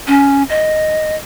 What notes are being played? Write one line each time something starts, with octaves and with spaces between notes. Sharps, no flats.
C#4
D#5